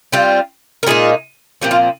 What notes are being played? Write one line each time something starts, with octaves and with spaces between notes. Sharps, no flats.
G3 C4 F4
A#4
A#2 G#3 D#4 F4 G#4
A#2 F3 C4 G4
F4